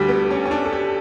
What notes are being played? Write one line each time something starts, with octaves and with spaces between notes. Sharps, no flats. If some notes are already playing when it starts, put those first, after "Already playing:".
Already playing: D2 D3 G3 G4
B3
C#4
C#4
D4
A4
G4